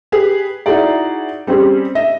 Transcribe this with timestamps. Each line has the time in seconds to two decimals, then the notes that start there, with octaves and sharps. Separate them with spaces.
0.12 G4 G#4 B4
0.66 D#4 E4 F#4 G#4 D5
1.47 G3 C4 C#4 G4 G#4
1.95 D#5 E5 A#6